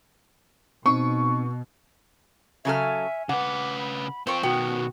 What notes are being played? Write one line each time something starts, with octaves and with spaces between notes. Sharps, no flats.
B2 C4 D#4 C#6
C#3 F#3 A4 C#5 E5 G#5 F6
C#3 B4 F#5 D6
B5
C4 F4 C5 G5 C#6
B2 D#3 B3 F#4 G5